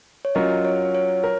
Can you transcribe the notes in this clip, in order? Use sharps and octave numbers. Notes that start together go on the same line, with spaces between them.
C#5
F#3 C#4 F4 A#4 D#5
C#5
C#5
A#4